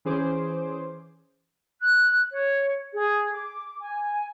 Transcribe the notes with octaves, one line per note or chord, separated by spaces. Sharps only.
E3 C#4 G#4 C5 D6
F#6
C#5
G#4
D6
G#5